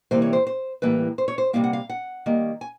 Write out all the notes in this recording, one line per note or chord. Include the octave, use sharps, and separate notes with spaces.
C3 E3 G3 A#3 C5
C#5
C5
C5
A2 E3 G3 A#3 B4
C5
C#5
C5
C3 E3 G3 A#3 F5
F#5
F5
F#5
D#3 G3 A#3
G#5